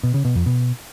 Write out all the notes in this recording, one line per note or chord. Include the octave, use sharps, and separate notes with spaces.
B2
C#3
B2
F2
B2